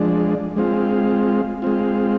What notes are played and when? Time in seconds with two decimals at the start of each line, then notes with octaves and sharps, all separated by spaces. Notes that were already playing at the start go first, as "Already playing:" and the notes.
Already playing: F3 G#3 D4
0.56 G#3 C4 F4
1.62 G#3 C4 F4